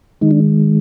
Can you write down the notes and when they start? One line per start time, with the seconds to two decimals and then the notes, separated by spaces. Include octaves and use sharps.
0.21 D#3 G#3 D#4
0.31 D4